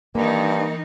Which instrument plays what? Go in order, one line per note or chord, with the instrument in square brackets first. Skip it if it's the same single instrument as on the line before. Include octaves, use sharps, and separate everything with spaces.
[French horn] G2 [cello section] D#3 E3 D#4 [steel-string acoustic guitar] A#3